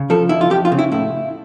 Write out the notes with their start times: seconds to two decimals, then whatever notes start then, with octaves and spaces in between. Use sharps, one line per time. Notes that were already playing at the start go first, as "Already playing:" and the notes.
Already playing: C#3
0.10 F3 A4
0.29 F2 E4
0.41 F4
0.50 F2 G4
0.65 F4
0.72 C#3
0.79 E4
0.92 A2 E4